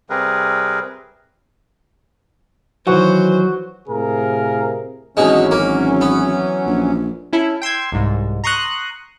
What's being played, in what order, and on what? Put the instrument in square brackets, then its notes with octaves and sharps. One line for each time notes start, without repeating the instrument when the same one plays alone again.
[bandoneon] C3 G3 C4 G#4 A#4 B4
[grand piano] D#3 E3 [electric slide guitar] F#3 [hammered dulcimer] F#4 [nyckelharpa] C5
[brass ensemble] A2 C3 G#4 A#4 F5
[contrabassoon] G#1 [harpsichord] B2 G#3 [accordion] E3 F#3 C#4
[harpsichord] A#3
B3
[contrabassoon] A#1
[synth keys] C#4 E4 A4
G5 C6 E6 G#6
C2 G#2
A#5 C6 C#6 D#6 F#6